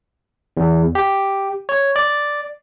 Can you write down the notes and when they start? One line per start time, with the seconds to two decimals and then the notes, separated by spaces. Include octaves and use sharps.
0.57 E2
0.95 G4
1.69 C#5
1.96 D5